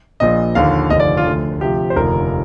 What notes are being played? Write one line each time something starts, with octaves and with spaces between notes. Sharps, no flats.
A#1 A#2 F3 D#5
D#2 D3 F3 F5
F1 D#2 D3 F3 D#5
D5
F4
D2 D3 F3
D2 C3 F3 G4
C5
F1 D#2 D3 F3 A#4